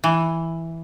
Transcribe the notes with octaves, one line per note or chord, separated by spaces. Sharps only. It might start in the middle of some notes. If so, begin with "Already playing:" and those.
E3